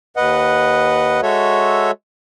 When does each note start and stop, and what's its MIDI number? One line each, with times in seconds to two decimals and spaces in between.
0.17 1.21 39
0.17 1.21 71
0.17 1.21 75
0.17 1.21 78
1.23 1.91 56
1.23 1.91 66
1.23 1.91 69
1.23 1.91 73
1.23 1.91 76